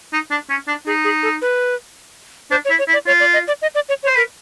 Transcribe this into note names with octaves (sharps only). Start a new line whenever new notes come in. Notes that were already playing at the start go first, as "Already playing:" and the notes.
D#4
D4
C#4
D4
D#4 G#4
G#4
A4
B4
D4 C5
C#5
E4
C#5
E4
D5
F4 C#5
D5
D#5
D5
D#5
D5
C#5
C#5
C5
A#4 B4